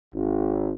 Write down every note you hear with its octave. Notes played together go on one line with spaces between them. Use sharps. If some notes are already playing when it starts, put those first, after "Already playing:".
G#1